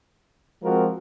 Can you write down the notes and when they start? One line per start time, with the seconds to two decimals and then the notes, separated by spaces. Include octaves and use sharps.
0.62 F3 G#3 C4 F#4 A#4